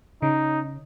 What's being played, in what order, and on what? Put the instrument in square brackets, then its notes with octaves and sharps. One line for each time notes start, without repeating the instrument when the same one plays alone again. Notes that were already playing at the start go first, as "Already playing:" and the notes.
[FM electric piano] C#3 [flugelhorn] D#4